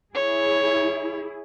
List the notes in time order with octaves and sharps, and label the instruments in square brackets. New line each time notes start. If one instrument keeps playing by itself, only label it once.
[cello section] E4 G#4 [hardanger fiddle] C#5